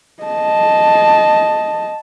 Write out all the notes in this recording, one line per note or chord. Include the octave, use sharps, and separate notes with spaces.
D#5 A5